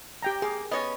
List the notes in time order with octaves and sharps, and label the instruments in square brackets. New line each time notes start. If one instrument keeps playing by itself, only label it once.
[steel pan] G4 G5 A#5
[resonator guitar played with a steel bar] A#3 [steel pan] G#4
[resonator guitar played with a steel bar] B3 C#4 C#5 [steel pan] D#5